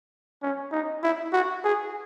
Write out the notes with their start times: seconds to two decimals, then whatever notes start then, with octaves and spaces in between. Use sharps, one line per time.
0.42 C#4
0.72 D#4
1.03 E4
1.33 F#4
1.64 G#4